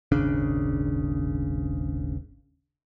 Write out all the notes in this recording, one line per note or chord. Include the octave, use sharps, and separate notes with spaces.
D#1 G#1 C#3 D4